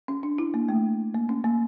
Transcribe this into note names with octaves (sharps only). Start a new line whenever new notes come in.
C#4
D4
E4
A#3
A3
A#3
C#4
A#3